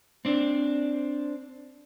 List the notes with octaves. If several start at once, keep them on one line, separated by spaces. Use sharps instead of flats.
C4 D4